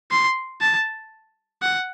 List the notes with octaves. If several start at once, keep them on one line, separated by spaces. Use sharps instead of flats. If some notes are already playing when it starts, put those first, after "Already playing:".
C6
A5
F#5